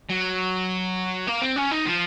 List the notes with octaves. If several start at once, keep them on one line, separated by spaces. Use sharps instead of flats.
F#3
A#3
C4
C#4
D#4
F3